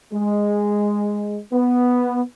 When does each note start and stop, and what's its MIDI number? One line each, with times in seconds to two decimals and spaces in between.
0.13 1.39 56
1.52 2.21 59